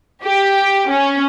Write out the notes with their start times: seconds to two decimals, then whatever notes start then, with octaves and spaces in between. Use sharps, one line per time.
0.24 G4
0.91 C#4